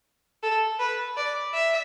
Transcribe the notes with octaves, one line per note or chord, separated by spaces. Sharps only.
A4
B4
D5
E5